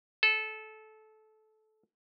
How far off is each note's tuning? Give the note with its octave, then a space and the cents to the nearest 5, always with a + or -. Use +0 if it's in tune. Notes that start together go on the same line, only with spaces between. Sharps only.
A4 -20